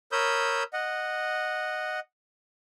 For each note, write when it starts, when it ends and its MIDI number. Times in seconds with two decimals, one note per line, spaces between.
0.12 0.63 70
0.12 0.63 73
0.12 0.63 83
0.12 0.63 87
0.12 0.63 88
0.12 0.63 91
0.73 2.00 75
0.73 2.00 78